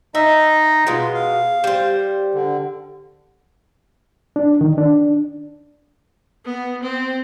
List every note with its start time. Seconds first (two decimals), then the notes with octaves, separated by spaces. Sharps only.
0.15 D#4 D#5 E5
0.87 B2 G#3 F4
1.14 F5
1.64 G3 C5
2.34 D3
4.36 D4
4.61 D#3
4.78 D4
6.45 B3
6.83 C4